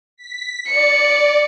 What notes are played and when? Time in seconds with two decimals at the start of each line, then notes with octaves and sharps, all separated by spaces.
0.17 B6
0.68 D5 C#7